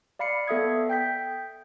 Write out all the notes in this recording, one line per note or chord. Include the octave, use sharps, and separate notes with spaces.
D5 F5 B5 C7 C#7
B3 A4 E5 D#6 G#6
G5 G6 B6